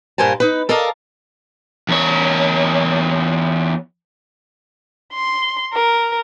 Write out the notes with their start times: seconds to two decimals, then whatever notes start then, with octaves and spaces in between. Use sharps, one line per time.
0.18 G2 A#2 A#4 C5 G#5 A5
0.40 D#4 B4
0.69 A4 A#4 D5 D#5 F5 A5
1.89 E2 C#5
5.13 C6
5.73 A#4